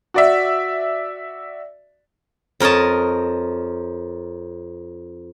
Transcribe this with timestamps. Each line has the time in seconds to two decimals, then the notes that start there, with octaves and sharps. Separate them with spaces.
0.14 F#4 D5 E5
2.60 F2 A#4 C#5 D#5 A5